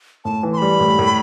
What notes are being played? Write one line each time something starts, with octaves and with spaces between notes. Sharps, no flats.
A2 A5
E3
C6
G3 B5
A2
A2